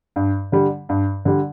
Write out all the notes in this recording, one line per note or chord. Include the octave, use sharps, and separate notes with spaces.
G2
D3 G3
G2
D3 G3